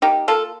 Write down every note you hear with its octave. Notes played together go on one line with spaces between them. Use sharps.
A#3 D#4 G4
A#3 F4 A4